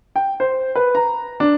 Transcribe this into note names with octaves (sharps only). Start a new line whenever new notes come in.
G5
C5
B4
A#5
D4